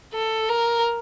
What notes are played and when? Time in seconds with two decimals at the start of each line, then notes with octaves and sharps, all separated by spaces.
0.13 A4
0.49 A#4